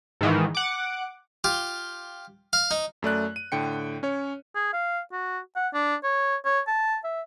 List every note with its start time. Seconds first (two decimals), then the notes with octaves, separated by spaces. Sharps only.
0.21 G#2 D#3 E3
0.55 F#5 D6
1.44 F4 G4
2.53 F5
2.71 D#4
3.02 F#2 A3 D5 F#6
3.36 D#7
3.52 A2 D3 G5 C#7
4.03 C#4 C#5
4.55 G#4
4.73 F5
5.12 F#4
5.56 F#5
5.74 D4
6.03 C#5
6.45 C#5
6.67 A5
7.04 E5